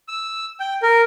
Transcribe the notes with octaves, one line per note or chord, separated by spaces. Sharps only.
E6
G5
A#4